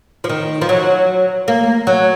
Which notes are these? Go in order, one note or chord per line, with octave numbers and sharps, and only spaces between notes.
F3
D#3
F3
F#3
A#3
F#3